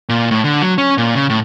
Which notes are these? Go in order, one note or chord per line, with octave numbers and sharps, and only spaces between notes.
A#2
A2
D3
F#3
C#4
A#2
C#3
A2